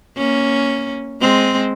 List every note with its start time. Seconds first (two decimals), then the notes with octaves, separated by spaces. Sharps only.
0.18 A#3 C#4
1.21 G#3 C4